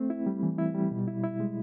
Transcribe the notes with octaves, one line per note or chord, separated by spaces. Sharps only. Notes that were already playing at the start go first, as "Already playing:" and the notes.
Already playing: A3 C4
E4
G3
E3
E4
G3
B2
E4
E4
G#3